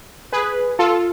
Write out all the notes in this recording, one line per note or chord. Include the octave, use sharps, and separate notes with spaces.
G#4 B4
F4 A4